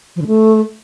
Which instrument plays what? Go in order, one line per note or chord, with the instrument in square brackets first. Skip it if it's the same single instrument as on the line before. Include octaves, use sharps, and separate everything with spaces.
[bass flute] F3
D3
A3